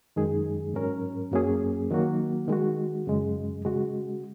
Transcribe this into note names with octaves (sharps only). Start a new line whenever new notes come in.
F#2 D#3 G#3 D#4 G#4
G#2 F#3 C#4 A#4
F#2 F#3 A#3 C#4 G#4
D#3 F#3 A#3 F#4
D#3 G#3 F#4
F#2 C#3 G#3
C#3 G#3 F#4